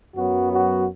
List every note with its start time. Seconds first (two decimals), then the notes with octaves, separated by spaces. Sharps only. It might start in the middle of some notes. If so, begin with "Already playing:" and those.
0.15 F#2 F#3 B3 F#4
0.53 F#4